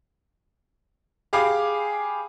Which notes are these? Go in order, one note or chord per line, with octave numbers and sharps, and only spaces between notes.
G4 G#4 F5 B5 D6